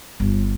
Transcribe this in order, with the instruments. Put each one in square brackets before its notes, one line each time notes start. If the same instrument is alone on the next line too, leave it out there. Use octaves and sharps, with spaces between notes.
[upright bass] G1